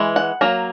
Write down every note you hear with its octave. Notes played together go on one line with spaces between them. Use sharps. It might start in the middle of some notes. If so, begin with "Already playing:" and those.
Already playing: E3 G#3
F#5
F#3 A#3